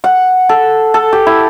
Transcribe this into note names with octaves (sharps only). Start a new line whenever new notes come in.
F#5
A4
A4
G4
E4